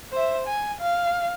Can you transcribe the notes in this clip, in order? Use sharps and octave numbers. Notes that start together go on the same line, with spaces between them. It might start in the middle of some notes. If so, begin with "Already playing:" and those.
C5 E5
G#5
F5